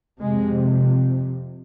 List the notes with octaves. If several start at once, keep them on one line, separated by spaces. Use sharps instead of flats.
F2 C3 G#3